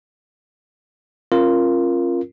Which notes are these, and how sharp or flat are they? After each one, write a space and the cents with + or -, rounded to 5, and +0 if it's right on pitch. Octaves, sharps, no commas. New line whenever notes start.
C#4 -40 F4 -10 A#4 +0